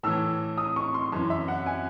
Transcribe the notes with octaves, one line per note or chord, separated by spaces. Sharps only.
A2 E3 E6
D#6
C#6
C6
F#2 E3
E5
F#5
G#5